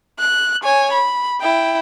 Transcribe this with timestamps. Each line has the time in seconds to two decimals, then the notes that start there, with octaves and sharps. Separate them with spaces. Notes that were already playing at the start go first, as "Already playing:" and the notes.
0.19 F#6
0.64 C#5 G#5
0.92 B5
1.40 E4 G5